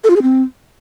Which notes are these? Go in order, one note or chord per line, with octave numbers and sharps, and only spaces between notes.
A4
F4
G#4
C4